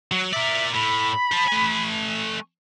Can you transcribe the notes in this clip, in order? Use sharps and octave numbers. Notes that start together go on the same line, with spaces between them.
F#3
A#4 D5 E5
A2 B5
C5 A5
A3 G#5